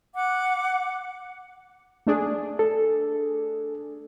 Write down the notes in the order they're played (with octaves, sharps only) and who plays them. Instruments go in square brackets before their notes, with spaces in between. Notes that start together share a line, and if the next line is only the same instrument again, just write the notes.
[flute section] F#5 D6
[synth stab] A3 D4 G#4
[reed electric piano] A4